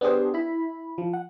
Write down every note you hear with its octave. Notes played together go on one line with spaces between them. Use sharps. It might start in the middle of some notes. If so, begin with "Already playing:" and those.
B3 D4 G4 G#4 C5
E4 B5
F3
F#5